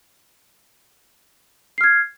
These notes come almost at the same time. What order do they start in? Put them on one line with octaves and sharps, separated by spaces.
C7 F6 G#6